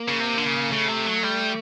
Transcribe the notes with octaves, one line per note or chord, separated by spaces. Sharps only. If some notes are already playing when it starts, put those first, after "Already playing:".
Already playing: A#3
C#3
C3
D3
C#3
C#3 A3
C3
F#3
G3